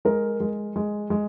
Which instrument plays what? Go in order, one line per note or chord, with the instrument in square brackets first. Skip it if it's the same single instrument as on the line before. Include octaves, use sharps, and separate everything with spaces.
[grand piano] G#3 A#4
G#3
G#3
G#3